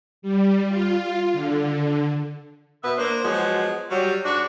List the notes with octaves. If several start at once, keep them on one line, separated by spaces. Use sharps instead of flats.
G3
F4
D3
B2 B3 B4 E5
A#3 D4 C5
F3 F#3 G#3 B3 F#4
F#3 G3
G#2 D4 F#4